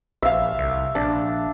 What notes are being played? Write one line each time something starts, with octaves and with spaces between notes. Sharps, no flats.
A#1 E5 F5
C2
A#1 D4